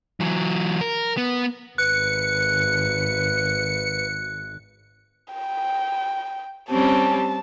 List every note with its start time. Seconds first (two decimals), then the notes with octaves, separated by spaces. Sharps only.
0.20 E3 F#3
0.81 A#4
1.17 B3
1.78 G#1 B4 F#6 C#7
5.34 G5
6.71 G3 C4 C#4 A5